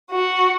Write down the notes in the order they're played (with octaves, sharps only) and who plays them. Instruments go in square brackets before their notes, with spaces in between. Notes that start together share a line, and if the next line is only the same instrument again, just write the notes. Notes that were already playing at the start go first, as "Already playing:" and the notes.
[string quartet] F#4